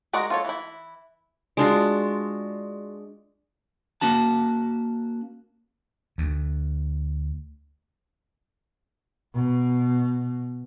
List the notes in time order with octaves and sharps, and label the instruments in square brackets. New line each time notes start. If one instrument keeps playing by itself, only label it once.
[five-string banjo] G#3 F#4 A#4 D5
F4 A4 C#5
E3 E4
[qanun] G#3 D4 F4 F#4
[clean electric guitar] A#3 C#4 F#4 A5
[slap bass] D2
[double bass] B2